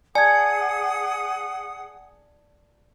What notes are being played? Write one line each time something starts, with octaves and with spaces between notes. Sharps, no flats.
G#4 D5 F#5 G#5 A5 D#6 G#6